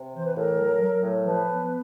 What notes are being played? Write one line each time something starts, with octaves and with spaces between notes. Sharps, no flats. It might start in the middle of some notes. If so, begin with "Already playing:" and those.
Already playing: C3
E3 C5
B4
A2 A#4
F#3
F#3
A2
F3 B4
B3